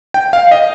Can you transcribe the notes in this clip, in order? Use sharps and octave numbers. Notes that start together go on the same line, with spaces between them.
G5
F5
D#5